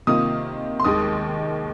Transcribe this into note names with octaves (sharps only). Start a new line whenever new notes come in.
C3 D#3 A#3 F4 D#6
C6
D#2 D#3 G#3 D#6